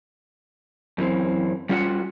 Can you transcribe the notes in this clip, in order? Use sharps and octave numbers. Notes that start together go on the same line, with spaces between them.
F#2 E3 C4
G3 C#4 F4 F#4 C#5 F#5